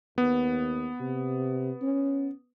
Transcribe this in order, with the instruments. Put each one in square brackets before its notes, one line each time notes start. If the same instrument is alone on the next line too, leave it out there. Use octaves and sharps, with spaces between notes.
[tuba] D#2 [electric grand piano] B3
[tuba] C3
C#4